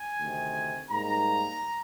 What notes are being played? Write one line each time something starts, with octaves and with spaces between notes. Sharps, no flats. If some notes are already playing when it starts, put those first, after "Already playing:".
Already playing: G#5
D2 C3 D#3
G#2 G3 A#3 D#4 A#5